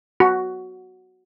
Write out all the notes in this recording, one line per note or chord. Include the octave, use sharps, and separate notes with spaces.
F#4